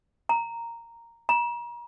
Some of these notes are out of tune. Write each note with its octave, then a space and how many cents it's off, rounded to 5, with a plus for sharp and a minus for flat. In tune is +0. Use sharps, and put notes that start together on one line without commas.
A#5 -10
A#5 +35